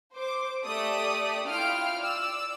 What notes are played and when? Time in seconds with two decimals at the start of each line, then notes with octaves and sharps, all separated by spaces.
0.13 C5 D6
0.64 A3 G4 A4 D5 D#6
1.48 E4 F4 F5 G5 F6 D7
2.00 D5 E6